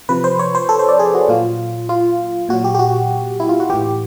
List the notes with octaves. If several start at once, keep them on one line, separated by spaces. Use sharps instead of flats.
C3 F3 B4
C5
C#5
C5
A4
C5
D5
G#4
F#4
A#2 F#3 F4
F4
A#2 F#3 F#4
G4
G4
F#4
E4
F4
F#4
A2 E3 G4